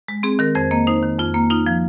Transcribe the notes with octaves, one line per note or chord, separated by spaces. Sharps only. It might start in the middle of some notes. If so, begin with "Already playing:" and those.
G#3
C4 G#4
D#3 A#4
F2 C5
A#3 D#5
D#4 C5
D#3
F2 F4
A#3
D#4 F4
F3